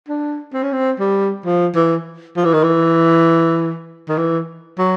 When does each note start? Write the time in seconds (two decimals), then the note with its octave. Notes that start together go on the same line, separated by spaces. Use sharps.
0.09 D4
0.53 C4
0.63 C#4
0.73 C4
0.99 G3
1.46 F3
1.75 E3
2.37 F3
2.45 E3
2.54 D#3
2.64 E3
4.09 D#3
4.18 E3
4.79 F#3